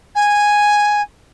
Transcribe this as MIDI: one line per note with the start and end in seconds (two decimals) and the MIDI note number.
0.15 1.01 80